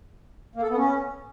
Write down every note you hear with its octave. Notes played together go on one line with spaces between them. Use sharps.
A#3
A4
B3
C#4